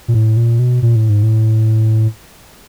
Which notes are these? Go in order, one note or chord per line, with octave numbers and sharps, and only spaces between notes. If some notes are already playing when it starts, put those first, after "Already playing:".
A#2
A2
A#2
B2
A#2
A2
G#2
A2